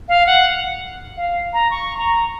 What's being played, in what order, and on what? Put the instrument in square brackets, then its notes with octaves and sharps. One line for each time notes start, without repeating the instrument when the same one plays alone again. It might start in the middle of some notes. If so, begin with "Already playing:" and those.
[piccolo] F5
F#5
F5
A#5
C#6
A#5